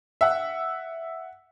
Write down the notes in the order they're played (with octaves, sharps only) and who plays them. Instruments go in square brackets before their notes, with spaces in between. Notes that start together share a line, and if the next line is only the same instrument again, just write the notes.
[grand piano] E5 F#5